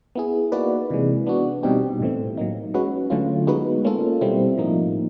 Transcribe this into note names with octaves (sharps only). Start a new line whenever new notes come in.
B3 E4 G#4
A#3 D#4 F#4 B4 D5
C3 E3 G#3
B3 D4 F#4
B2 G3 C4 D#4 G4
A2 E3 A3 C4
F#3 A#3 D#4
G#3 C#4 F#4 B4
D3 F#3 A3 C#4 F4
G#3 B3 D#4 F#4 B4
A#3 C#4 F4 A4
B2 G3 C4 E4
A2 F3 A#3 D#4